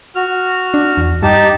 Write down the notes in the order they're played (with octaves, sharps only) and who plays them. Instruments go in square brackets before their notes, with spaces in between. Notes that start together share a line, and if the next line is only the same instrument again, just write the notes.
[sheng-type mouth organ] F#4 F6
[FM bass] D4
E2
[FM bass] G2 [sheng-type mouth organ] D#4 G4 A5